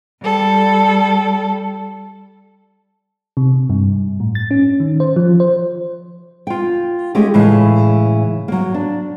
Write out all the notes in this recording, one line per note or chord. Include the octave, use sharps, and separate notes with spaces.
G3 A4
C3
G2
A2
A6
C#4
D#3
C5
F3
C5
F4 G5
G#3 A3 C#4 G4
A2 C#3 E3 G#3
F#3 A#3
D4